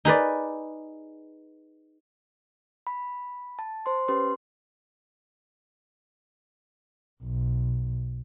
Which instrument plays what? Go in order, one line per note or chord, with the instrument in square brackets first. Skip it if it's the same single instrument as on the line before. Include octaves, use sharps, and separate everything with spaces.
[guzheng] D#4 G#4 B4 D5
[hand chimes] B5
A5
C5 C6
C#4 G4 B4 C6
[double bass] B1